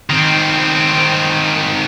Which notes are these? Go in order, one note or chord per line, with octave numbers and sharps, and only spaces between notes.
D#3 C4